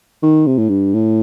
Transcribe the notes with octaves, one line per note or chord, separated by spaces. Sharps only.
D#3
C3
A2
G2
A2